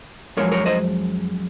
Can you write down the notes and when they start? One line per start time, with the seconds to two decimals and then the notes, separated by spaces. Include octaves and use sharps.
0.37 F#2 F3 G#3 A#4 C#5
0.52 A#4 C#5
0.66 C5 D#5